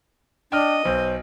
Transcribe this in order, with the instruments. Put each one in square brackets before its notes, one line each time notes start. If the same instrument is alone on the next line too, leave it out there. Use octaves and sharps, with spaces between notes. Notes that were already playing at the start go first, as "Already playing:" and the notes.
[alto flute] D4 [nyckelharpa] D#5 [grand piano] G5 F6
[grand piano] B1 [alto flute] C5